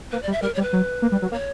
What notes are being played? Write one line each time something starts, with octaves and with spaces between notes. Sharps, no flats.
A#3 B4
G3 D5
E5
G3 A#4
G3 C#5
B4
F#3
A#3
G3
F#3
A#3 C#5